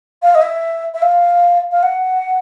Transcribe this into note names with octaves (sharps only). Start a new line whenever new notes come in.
F5
D#5
E5
E5
F5
F5
F#5